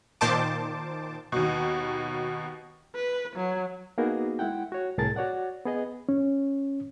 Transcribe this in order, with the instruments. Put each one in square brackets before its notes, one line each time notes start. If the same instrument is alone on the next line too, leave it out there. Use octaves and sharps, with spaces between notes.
[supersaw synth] A#2 D#3 C5 A5 D6
[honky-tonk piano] D#2 B2
[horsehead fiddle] B4
F#3
[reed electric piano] A#3 B3 D#4 F#4 G#4 A#4
G#3 E4 F#5 G5
F#4 C#5
C2 A2 G#4 A#4 A5 A6
F#4 C#5 D5 F#5
B3 G#4 D#5
C#4